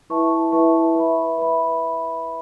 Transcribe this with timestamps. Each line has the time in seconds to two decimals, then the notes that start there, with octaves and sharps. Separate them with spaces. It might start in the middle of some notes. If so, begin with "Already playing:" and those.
0.10 E4 B4 E5 A5 C#6
0.52 E4 B4 E5 A5 C#6
0.95 B4 E5 B5
1.38 B4 E5 B5